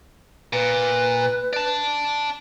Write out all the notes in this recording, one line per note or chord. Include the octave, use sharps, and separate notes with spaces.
A#2 B4
D5 A5